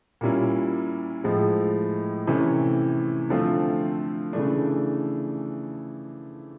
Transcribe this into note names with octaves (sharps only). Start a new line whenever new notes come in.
A#2 G3 A#3 C#4 E4
A2 F3 G#3
C3 E3 A3 C#4
D3 F3 A3 C4 F4
C#3 E3 A3 D4